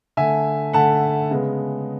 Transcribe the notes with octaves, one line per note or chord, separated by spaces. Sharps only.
D3 A3 E5 G#5
D3 A3 F#5 A5
C#3 G#3 B3